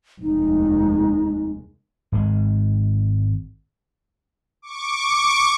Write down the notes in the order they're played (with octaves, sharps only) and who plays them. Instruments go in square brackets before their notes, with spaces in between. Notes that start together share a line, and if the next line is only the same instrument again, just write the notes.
[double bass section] F1 D#2 G#3 [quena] D#4
[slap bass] G#1 G#3
[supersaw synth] C#6 D6